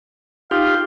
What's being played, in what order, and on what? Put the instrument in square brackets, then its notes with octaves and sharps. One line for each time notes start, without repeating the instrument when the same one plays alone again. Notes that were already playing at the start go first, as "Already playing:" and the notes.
[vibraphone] D#4 [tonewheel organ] F4 G4 [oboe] F5